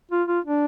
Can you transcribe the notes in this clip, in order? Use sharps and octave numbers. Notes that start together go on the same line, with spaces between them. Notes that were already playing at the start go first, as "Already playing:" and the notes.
F4
F4
D4